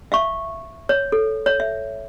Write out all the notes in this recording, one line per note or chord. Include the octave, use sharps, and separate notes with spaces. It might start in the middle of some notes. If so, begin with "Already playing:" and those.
E5 F5 C#6
C#5
A4
C#5
E5